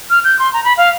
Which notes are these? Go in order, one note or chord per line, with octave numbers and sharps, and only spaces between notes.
F6
G6
C6
A#5
B5
F5